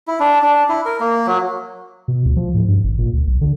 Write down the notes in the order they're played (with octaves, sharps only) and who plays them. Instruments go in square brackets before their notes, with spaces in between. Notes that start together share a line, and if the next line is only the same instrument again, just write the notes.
[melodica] E4
D4
D4
E4
A#4
A#3
F#3
[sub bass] B2
D2
F3
A2
G2
G#1
A#2
D2
B1
D3